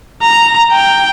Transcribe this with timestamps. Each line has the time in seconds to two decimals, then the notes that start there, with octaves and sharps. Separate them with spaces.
0.22 A#5
0.72 G5